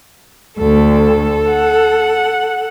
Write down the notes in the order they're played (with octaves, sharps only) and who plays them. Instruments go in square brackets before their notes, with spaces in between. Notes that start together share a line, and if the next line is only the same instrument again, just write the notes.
[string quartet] D2 [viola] A4
[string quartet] F#5